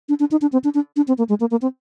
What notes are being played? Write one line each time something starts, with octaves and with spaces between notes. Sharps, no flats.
D4
D4
D#4
D4
C4
D4
D4
D4
C4
A#3
G#3
A#3
A#3
C4